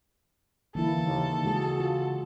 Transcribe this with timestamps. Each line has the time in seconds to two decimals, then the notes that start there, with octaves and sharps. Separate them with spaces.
0.75 D3 E3 A#3 E4 A4
1.06 D#2 C#3
1.45 G#3 F#4 G#4
1.80 F4